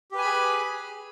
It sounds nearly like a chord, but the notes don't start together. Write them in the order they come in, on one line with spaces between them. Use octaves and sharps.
G4 B4 G#5 B5 G#4